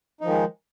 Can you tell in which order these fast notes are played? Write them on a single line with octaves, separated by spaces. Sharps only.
D#4 F3 D#3 G#3